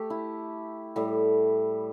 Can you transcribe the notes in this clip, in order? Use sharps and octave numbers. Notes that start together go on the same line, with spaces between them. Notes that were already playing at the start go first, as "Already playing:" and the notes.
Already playing: A3 G4
E4
A2 G3